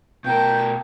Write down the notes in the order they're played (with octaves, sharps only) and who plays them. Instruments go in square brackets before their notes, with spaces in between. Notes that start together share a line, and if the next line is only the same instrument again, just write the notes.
[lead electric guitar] B2 A#4 [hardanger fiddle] G5 A5 [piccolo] G6